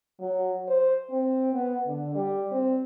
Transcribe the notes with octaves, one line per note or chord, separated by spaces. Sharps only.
F#3
C5
C4
B3
D3
G3
C4